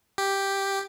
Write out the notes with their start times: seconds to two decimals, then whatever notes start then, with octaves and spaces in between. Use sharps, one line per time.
0.18 G4